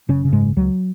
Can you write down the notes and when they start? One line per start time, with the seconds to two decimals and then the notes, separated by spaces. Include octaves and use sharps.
0.08 F#1 C#3 C#4
0.25 C#3
0.32 G#2 G#3
0.41 F#1
0.56 C#2 F#3